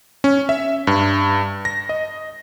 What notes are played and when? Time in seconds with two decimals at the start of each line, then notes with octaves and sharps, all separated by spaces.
0.24 C#4
0.49 E5
0.87 G2
1.65 A#6
1.89 D#5